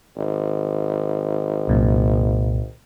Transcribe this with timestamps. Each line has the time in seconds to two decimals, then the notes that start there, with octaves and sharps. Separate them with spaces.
0.16 G#1
1.68 C2 F#2 A#2